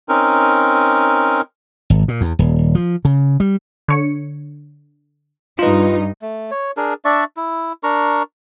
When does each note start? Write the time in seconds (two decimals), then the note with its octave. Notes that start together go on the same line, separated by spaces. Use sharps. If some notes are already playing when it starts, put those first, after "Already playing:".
0.09 C4 C#4 D#4 A#4
1.90 G#1
2.08 A#2
2.21 E2
2.39 D#1
2.75 F3
3.05 C#3
3.40 G3
3.88 D3 C#5 C#7
5.59 G2 D#4 F4 B4
6.22 A3
6.51 C#5
6.77 D4 G#4 A#4
7.05 D4 D5 E5 C#6
7.37 E4
7.83 D4 A#4 A#5 C#6